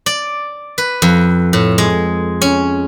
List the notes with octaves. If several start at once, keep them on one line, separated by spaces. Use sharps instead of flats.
D5
B4
F2
A2
G#3
C#4